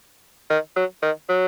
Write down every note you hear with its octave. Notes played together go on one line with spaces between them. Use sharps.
D#3
F#3
D#3
F#3